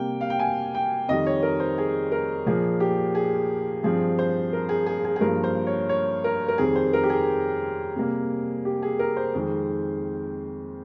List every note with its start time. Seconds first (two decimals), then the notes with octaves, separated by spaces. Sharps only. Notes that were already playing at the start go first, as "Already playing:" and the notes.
Already playing: C3 G3 A#3 G5
0.21 F5
0.30 G5
0.39 G#5
0.75 G5
1.08 F2 D#3 G3 D#5
1.26 C#5
1.43 A#4
1.60 C5
1.78 G#4
2.12 A#4
2.46 A#2 F3 A#3 G#4
2.80 G4
3.15 G#4
3.83 G2 F3 C4 G#4
4.19 C5
4.53 A#4
4.69 G#4
4.86 G#4
5.05 G#4
5.16 G#4
5.21 G2 F3 A#3 A#4
5.44 C5
5.67 C#5
5.89 C#5
6.24 A#4
6.48 A#4
6.58 F2 D#3 G3 C4 G#4
6.76 C5
6.93 A#4
7.03 G4
7.10 G#4
7.96 C3 G3 A#3
8.65 G4
8.83 G#4
8.99 A#4
9.17 C5
9.34 F2 D#3 G#3 C4